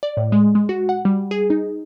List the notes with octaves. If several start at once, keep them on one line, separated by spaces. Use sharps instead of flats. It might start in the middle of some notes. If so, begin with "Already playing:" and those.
D5
A2
G#3
G#3
F#4
F#5
G3
G#4
D#4